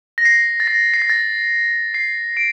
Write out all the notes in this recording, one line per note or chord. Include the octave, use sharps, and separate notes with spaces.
A#6
C7
A6
A#6
C7
A#6
A6
C7
D7